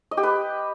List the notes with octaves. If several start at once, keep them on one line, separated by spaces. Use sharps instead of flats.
D#5
G4
B4